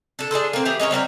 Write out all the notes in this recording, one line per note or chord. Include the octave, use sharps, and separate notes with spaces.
D4 A4
D4 G#4 A4 C5
A#3 C4
E3 G4 G#4 G5
G#3 C#4 A#4 C#5
G3 C4 F#4 A#4